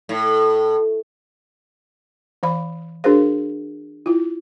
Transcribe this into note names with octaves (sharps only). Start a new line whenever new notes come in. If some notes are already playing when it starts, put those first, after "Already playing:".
A2
E3 C5 F5 B5
D4 F#4 G#4 A#4 C5 F5
E4 F4